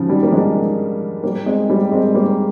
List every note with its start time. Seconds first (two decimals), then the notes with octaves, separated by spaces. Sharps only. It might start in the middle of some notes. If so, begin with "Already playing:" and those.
Already playing: C#3 F3
0.08 D#3 G3
0.23 A#3
0.32 F3 G#3
1.24 G3 A#3
1.46 G#3 C4
1.69 G3 A#3
1.91 G#3 C4
2.04 G#3
2.14 G3 A#3